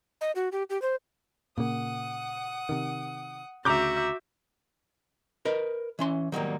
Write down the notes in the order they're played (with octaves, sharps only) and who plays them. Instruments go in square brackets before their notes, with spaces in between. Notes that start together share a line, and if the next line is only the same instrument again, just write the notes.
[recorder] D#5
F#4
G4
G4
C5
[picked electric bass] A#2 C#3 A#3 [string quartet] F#5 D#6
[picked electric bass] C3 D#3
[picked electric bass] D2 C#3 [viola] F#4 E5 [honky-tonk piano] A#5 D6 G6
[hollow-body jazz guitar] A#4 B4 D#5
E3 C#4 C6
D#3 F#3 G3 A#3